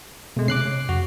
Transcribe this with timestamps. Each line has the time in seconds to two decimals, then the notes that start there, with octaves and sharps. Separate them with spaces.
0.37 B2 G#3 A3
0.48 C3 C#4 D6 F#6 C7
0.89 F2 F#4